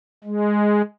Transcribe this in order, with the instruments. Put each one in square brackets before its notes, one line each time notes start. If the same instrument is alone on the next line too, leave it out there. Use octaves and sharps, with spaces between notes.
[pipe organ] G#3